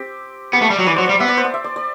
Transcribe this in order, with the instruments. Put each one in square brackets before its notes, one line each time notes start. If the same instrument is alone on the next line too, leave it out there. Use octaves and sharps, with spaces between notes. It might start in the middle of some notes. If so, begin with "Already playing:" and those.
Already playing: [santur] C4 G4
[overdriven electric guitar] B3 [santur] G4
[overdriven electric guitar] A3
G3
F#3
[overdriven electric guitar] E3 [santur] D5
[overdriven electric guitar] F#3 [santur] C5
[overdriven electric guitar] G3 [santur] D5
[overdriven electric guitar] B3 [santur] E5
[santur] D5
C5
D5
E5
D5
D5